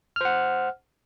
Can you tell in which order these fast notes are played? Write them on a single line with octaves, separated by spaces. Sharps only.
F6 C5 F#5